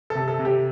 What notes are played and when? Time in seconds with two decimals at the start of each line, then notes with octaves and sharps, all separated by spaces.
0.10 A4
0.15 C3
0.28 A4
0.39 C3
0.45 G4